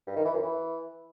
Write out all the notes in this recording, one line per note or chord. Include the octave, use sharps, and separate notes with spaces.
G2
D#3
E3
F#2
E3